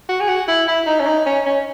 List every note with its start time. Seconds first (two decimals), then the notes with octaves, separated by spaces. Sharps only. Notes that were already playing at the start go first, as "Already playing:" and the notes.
0.09 F#4
0.21 G#4
0.29 F#4
0.48 E4
0.67 E4
0.87 D#4
1.00 C#4
1.07 D#4
1.26 C#4
1.46 C#4